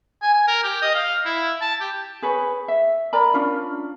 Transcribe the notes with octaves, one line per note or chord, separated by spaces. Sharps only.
G#5
G#5
A#4
G4
D#5
F5
E4
A5
G4
G#4 B4 C#5
E5
A#4 D5 A#5 B5
C#4 D4 F4